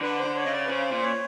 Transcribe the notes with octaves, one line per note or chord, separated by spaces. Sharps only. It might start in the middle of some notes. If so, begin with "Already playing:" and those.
D3 B4
C5
D3
C#5
C#3 D#5
D5
B4
C#3 C5
A#2
C#5